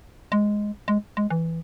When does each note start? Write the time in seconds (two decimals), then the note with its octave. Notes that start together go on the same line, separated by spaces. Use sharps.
0.32 G#3
0.88 G#3
1.17 G#3
1.30 E3